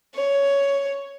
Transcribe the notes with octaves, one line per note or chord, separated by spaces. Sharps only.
C#5